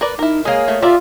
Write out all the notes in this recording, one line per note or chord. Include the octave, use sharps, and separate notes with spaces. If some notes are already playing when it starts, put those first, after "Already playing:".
A#4 B4 D5
D#4 E4 A#4
G#3 A#3 G#4 C#5
A3
F4 G4 A#4 D5 E5